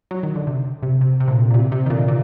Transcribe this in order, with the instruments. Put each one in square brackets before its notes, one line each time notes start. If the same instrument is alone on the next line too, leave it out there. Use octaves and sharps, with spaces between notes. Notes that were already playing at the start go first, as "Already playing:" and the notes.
[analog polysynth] F#3
D#3
D3
C3
C3
C3
C3
A#2 D3
A#2
C3
C3
D#3
A#2 D3
A#2